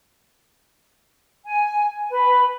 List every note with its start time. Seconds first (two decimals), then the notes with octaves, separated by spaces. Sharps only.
1.45 G#5
2.10 B4